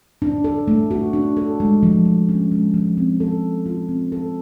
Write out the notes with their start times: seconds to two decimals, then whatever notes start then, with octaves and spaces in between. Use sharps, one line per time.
0.22 D4
0.44 A4
0.68 A3
0.91 F#4
1.13 D4
1.37 A4
1.60 G#3
1.83 F3
2.06 F3
2.29 C#4
2.52 G#3
2.74 F3
2.97 C4
3.20 A4
3.44 G#3
3.66 F4
3.89 C4
4.12 A4